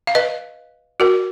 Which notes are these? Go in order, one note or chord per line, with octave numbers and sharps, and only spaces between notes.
F5
B4 D#5
F#4 A#4